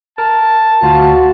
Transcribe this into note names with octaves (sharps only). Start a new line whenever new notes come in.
A#4 A5
D2 F4 F#4